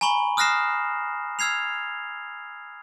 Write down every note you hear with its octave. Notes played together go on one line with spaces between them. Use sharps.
G#5 A#5 B5 C#6 F#7
D#6 F6 F#6 A#6 C7 E7
E6 F6 G#6 C7 F7